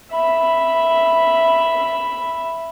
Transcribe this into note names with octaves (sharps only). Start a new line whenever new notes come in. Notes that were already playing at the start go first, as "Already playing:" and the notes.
E5 B5